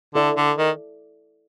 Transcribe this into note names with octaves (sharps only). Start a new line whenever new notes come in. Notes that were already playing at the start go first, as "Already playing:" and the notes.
D3 E4 A4 D5
D3
D#3